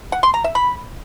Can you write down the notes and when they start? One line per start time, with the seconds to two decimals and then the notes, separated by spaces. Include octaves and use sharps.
0.12 F#5
0.23 C6
0.34 A#5
0.44 E5
0.55 B5